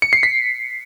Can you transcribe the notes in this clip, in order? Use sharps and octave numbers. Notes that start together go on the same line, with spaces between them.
C#7
C7
B6